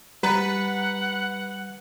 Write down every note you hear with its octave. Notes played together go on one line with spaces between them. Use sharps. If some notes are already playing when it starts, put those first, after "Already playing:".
G3 B4 F#5 A#5 A6